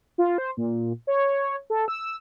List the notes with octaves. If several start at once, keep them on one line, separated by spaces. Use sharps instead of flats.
F4
C5
A#2
C#5
A4
E6